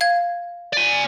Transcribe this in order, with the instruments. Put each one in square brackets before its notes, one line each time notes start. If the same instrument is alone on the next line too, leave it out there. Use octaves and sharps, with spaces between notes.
[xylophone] F5 G#6
[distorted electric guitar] D5 G#5